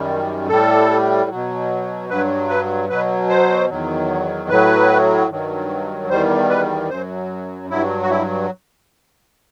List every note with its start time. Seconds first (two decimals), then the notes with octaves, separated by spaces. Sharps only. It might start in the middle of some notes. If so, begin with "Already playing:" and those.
Already playing: F#2 D#3 G3
0.49 A2 G3 A4
1.30 B2 F#3
2.09 G2 F#3 B4
2.49 B4
2.89 B2 F#3 B4
3.29 C5
3.69 E2 D#3 F#3
4.50 A2 F#3 B4
5.29 G2 D#3 F#3
6.09 E2 D#3 G3 C5
6.50 B4
6.89 F#2 F#3 C5
7.70 G2 F#3 E4
8.02 F#4
8.10 E4